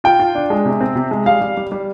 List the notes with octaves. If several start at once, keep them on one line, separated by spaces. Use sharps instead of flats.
F4 G5
F4
D4
G#3
C3
C4
C3
G#3
G3 F5
G3
G3
G3